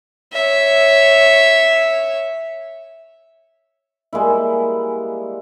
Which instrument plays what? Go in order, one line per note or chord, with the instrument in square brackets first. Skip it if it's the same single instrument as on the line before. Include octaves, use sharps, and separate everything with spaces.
[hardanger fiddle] C#5 E5
[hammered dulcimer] G3 G#3 A#3 E4